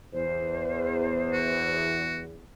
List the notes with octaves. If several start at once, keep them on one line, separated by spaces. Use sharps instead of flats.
E2 C5
F#4